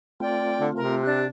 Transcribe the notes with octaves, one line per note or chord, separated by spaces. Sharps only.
A3 C4 F4 D5 G5
D3
C3 A#4
D4 G4 F#6